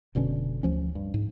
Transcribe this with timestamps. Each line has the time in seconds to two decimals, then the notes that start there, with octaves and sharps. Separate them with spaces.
0.15 F1 B2 D3 C#4
0.63 D2 F3 C#4
0.95 G2
1.14 G#2